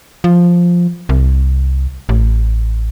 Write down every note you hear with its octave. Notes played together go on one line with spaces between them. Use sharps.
F3
C2
A1